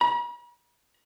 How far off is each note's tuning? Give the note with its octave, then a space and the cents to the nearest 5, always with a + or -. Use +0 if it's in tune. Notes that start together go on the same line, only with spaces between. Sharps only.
B5 -45